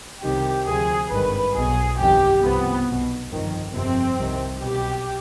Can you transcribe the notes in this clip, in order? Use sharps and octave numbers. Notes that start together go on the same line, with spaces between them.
C2 C3 D#3 G4
D2 C3 F3 G#4
G#1 G2 D#3 B4
B1 B2 G#4
G1 F2 D#3 G4
C2 C3 F3 B3
B1 B2
G1 F2 D#3
G1 F2 C3 C4
C2 C3 D#3
B1 B2 G4